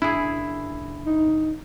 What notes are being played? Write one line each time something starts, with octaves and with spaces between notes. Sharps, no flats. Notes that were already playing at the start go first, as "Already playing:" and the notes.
F#1 D4 E4 G#4
D#4